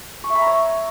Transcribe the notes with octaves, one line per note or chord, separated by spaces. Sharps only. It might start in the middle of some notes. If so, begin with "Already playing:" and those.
C#6
E5
B5
A#5
C#5